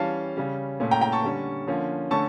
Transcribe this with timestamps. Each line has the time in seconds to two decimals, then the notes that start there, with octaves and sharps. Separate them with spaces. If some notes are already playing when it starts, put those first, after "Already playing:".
Already playing: E3 G3 C#4 F5 A5
0.37 C#3 G3 C#4
0.80 A#2 A3 C#4
0.91 G5 A#5
1.01 G5 A#5
1.12 A5 C#6
1.23 D3 G3 C#4
1.67 D3 F3 A#3 C#4
2.10 D3 A3 C#4 A5 C#6